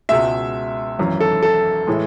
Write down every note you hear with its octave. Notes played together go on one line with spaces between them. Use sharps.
C#2 B2 G#3 E5
G#1 F#2 E3
A4
A4
A2 E3 G#3